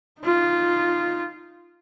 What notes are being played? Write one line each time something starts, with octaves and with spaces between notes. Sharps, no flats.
D#4 F4